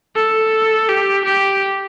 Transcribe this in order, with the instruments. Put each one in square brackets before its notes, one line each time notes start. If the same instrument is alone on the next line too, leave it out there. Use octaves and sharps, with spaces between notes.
[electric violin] A4
G4
G4